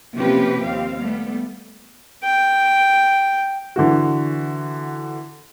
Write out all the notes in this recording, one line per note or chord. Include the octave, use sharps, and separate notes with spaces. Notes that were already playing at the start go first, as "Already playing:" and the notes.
C3 F3 A#3 C#4 G4 B4
D#2 C4 F5
G3 A3 B3
G5
D3 E3 F#4